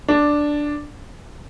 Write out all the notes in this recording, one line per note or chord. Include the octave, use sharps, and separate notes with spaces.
D4